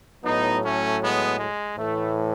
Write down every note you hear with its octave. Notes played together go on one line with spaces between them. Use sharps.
A2 F#3 B3 D#4
A3 C#4
G#3 B3
G#3
A2 E3 A3